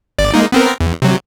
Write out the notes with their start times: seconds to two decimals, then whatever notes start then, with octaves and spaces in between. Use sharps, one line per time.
0.18 G1 D5
0.34 G#3 A#3 D#4
0.52 B3 C4 A#4
0.80 E2
1.02 C3 F#3